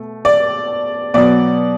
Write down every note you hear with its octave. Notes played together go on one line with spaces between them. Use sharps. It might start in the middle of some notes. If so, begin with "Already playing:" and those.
Already playing: B2 A3
D5
B2 F#3 B3 D5